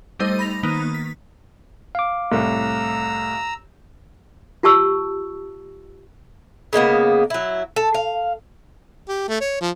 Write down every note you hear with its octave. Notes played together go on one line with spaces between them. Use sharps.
G3 A3 D#4 C5 D#5
B5 A#6 F7
D#3 A#3 B3 D#4
B6
F5 D6
C2 A2 A#5 E6
F4 G4 A5 C#6 E6
C#3 G#3 A#3 B3
F#3 E4
A4
F5
G4
A3
C#5
F3